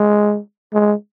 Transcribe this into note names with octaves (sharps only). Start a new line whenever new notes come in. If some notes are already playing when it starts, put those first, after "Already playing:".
Already playing: G#3
G#3